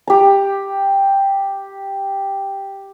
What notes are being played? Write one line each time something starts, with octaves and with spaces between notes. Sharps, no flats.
G4 A#5